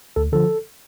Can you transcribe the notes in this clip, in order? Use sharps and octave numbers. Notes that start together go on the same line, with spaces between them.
D2 A4
D3 F3 A4